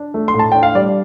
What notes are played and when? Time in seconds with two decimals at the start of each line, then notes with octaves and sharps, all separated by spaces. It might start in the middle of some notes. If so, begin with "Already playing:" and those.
Already playing: D4
0.14 A3
0.28 C6
0.34 A2
0.39 A5
0.52 D4 G5
0.63 F5
0.75 G3 D5